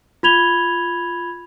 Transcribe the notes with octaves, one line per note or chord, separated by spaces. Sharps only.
F4 B5 G#6 F7 G7